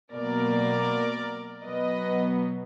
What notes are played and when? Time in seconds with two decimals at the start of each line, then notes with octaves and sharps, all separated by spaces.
0.13 B2 F#3 A#3 A#4 D5
1.64 B2 F#3 B3 B4 D#5